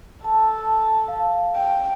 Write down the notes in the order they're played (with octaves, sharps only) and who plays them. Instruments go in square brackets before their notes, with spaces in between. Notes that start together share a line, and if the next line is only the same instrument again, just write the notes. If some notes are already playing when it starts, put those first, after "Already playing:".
[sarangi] A4 [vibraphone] A5
[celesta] F5
[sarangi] G5